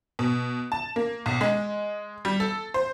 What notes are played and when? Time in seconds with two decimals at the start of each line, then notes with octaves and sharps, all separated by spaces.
0.19 B2
0.72 A5
0.96 A#3
1.26 B1
1.41 G#3
2.25 G3
2.40 A4
2.74 C5